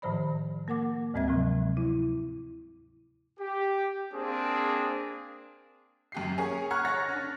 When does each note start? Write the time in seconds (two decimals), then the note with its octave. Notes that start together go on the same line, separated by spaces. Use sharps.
0.02 A2 D#3 F3 C5 D5 B5
0.68 A#3 A#4 F#5 D6
1.14 D2 G#2 G#3 C4 E5 G#6
1.28 C3 F3 F#3
1.77 E4
3.38 G4
4.13 A#3 C4 D4 G#4
6.12 F#2 G4 C7
6.38 A#3 C#4 G#4 C#5 G#5
6.70 F#5 A#5 C#6 F6 F#6 G#6
6.85 C#5 F#5 C#6 A6 A#6
7.09 C#4 D4